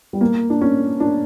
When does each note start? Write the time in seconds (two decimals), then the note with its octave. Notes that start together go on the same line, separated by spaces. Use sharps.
0.13 G3
0.21 A#3
0.50 D4
0.62 C#4
1.00 D4